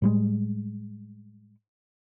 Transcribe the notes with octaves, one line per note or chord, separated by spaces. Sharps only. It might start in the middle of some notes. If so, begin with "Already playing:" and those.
A2 G3 G#3